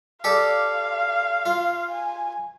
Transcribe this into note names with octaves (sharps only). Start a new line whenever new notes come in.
G4 A4 D5 F5
F4
G#5